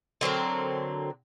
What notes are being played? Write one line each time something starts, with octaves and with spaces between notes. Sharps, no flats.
D3 F#3 C4 A#4